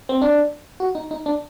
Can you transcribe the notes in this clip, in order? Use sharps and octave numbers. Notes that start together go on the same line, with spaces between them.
C4
D4
F#4
D#4
D#4
D4